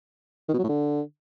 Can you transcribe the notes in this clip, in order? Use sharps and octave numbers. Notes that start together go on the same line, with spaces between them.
D#3
B2
F#3
A2
D3